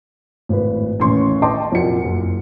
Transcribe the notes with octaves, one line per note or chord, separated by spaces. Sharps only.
G#1 A2 B4
A1 D#2 C#4 C6 C#6
D#5 G5 A5 C6 D6
C2 F2 A#2 F#4 C#7
F#1